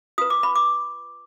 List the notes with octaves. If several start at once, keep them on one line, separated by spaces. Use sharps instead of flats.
F4 B4 D#6
D6
B5
D6